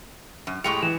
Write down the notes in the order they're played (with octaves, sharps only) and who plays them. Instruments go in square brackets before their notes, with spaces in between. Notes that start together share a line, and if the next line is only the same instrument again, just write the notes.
[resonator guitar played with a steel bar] F#2
[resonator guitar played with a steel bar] A2 G#3 G4 [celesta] C#6 F7 [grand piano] C#7
[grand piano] E3 [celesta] E7